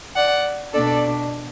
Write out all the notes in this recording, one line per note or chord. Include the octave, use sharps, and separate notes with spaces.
D5 F#5
B2 B3 D4 A4 D5